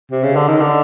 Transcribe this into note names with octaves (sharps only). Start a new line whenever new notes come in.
C3
C#3
D3
D#3
D3